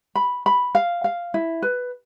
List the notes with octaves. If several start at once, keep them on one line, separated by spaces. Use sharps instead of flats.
B5
B5
F5
F5
E4
B4